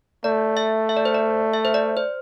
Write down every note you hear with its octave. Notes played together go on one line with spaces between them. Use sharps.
A3 D5
E5
E5
D5
C5
D5
E5
C5
D5
C5